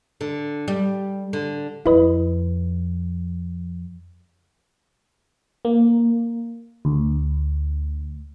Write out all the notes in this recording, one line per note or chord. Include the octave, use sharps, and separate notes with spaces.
D3
G3
D3
F2 E4 B4 D#5
A#3
D2